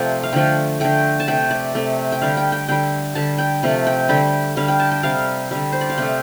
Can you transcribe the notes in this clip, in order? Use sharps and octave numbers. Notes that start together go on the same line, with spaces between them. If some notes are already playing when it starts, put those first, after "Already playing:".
Already playing: C3 F3 A3 D5 G5
F5
D3 F3 A3 G5
D3 A3 G5
A5
C3 A3 G5
D5
C3 A3
G5
D3 G3 F5
G5
G5
D3 G3 G5
D3 G3 A5
G5
C3 F3 A3
G5
D3 G3 G5
D3 G3 F5
G5
A5
G5
C3 G3 F5
D3 G3
C5
D5
F5
C3 A3 G5